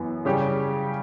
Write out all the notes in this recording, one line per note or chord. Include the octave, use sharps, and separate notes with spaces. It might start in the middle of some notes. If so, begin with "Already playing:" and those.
Already playing: F#2 E3 B3
C#3 G3 C#4 G4